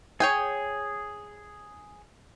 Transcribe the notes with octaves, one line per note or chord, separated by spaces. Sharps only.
G#4 C#5 G5 G#5